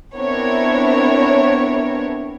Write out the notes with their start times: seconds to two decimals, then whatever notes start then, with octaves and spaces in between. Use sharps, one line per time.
0.15 B3 C4 D4 E4 A#4 C#5